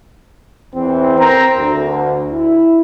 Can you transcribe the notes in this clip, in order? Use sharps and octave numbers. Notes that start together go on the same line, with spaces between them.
E2 E3 C4
C4 A#4 A#5
D2
E4